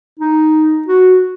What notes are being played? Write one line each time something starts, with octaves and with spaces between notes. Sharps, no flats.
D#4
F#4